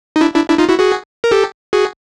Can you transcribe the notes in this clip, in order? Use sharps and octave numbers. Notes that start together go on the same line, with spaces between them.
D#4
D4 E4
D4 E4
D4 E4
D#4 F4
E4 F#4
F#4 G#4
A#4
G4 A4
F#4 G#4